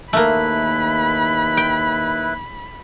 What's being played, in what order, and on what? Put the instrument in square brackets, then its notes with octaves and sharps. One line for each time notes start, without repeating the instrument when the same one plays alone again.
[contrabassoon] D#2 [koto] A3 A#3 [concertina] E4 B4 [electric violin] B5
[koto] G5